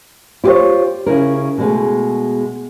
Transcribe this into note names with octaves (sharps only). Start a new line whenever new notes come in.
E4 F4 G4 A4 C5 C#5
C#3 E4 A#4
B2 G#3 A3